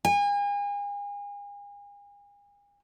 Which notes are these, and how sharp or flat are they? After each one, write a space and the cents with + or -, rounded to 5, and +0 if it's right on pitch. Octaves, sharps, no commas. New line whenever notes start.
G#5 -40